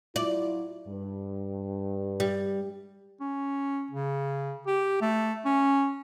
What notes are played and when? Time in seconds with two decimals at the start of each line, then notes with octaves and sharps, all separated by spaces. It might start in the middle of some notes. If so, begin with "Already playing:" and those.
0.16 F#3 E4 F4 D5
0.88 G2
2.20 G3
3.21 C#4
3.91 C#3
4.67 G4
5.02 A3
5.45 C#4